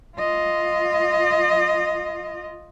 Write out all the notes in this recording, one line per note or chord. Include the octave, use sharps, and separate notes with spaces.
F4 D#5